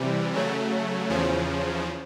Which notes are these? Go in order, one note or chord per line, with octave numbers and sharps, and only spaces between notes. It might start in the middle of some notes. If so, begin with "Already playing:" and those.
Already playing: C3 E3 G3
C#3 F#3 A3
E2 C#3 F3